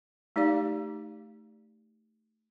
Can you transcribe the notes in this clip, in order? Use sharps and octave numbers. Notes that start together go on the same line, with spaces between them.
A3 D#4 G4 D5 F5